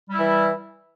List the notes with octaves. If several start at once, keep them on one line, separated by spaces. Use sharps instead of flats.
E3 G3 E4